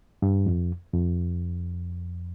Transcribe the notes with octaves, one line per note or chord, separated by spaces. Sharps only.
G2
F2
F2